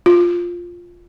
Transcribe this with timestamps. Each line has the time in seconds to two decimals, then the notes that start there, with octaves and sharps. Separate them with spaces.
0.06 F4